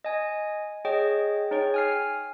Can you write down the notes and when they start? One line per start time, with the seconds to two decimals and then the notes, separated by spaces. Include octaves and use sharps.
0.05 D#5 G#5
0.85 G#4 C#5 D#5 G5
1.51 D#4 G#4 C#5 G5
1.74 G#5 F6 C7